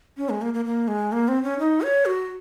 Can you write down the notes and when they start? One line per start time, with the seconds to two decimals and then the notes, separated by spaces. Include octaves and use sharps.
0.17 C#4
0.29 G#3
0.42 A#3
0.54 A#3
0.65 A#3
0.88 G#3
1.12 A#3
1.28 C4
1.43 C#4
1.59 D#4
1.82 C#5
2.05 F#4